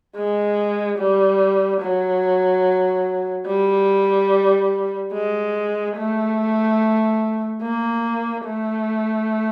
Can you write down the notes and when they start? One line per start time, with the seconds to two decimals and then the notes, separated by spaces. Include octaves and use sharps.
0.16 G#3
0.98 G3
1.81 F#3
3.47 G3
5.13 G#3
5.97 A3
7.62 A#3
8.46 A3